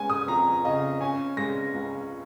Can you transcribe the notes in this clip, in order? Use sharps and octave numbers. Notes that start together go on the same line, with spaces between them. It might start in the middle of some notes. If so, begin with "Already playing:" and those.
Already playing: G#3 C#4 G#5 G#6
D#6
F2 A#5
C#3 D#5
C#4 G#5
G#3 A#6
C#2